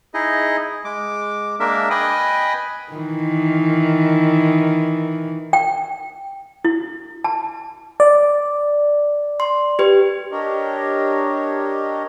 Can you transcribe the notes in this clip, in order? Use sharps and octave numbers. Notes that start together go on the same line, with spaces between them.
D#4 E4 G#4 D#5
G#3 D6
G#3 A#3 D4 A#4 E5
B4 D#5 G5 G#5 B5 D#6
D#3 E3
G5
E4
A5
D5
C6
G4 B4
D4 G4 A#4 C#5 D#5